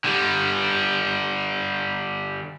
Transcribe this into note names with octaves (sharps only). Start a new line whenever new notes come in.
D3 G3